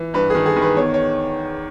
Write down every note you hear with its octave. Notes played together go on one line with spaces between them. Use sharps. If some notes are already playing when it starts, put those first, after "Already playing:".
Already playing: E3
G2 B4
D#3 G#4
G#4
D#3
B4
E2 C#5
C#5